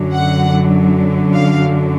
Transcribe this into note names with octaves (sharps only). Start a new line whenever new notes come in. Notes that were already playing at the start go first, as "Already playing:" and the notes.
Already playing: F#2 D3 F#3
F#5
F5